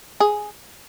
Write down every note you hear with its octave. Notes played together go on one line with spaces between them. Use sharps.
G#4